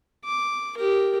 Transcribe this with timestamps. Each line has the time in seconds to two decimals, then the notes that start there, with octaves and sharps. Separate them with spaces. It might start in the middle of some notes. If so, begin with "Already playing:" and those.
0.24 D6
0.77 G4 A#4